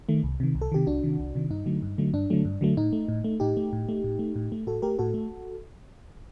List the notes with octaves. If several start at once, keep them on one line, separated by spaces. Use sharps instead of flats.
D#3 A3
C2
C3 D#3
C2
A4
C3 D#3 G4
C2 D4 F#4
C3 D#3
C2
C3 D#3
G2 D#4
D3 F#3 A3
G2
D3 F#3 A3
G2 D4
D3 F#3 A3
G2
D3 F#3 A3
A2 D#4
A3
A2
A3
A2 D#4 G4
A3
A2
A3
A2
A3
A2
A3
A2 F#4 A4
A3 G4 A#4
A2 F#4 A4
A3